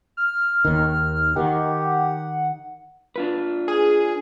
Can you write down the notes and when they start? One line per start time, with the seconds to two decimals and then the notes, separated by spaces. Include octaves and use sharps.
0.17 F6
0.65 D#2 D#3
1.36 D#3 G4 F#5
3.16 D4 F4 B4
3.68 G#4